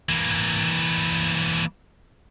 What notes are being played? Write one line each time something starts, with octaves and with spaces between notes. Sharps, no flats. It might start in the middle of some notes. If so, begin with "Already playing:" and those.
E3 A#3